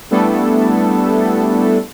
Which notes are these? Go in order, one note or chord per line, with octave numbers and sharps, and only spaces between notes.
G3 A3 B3 D4 E4 A4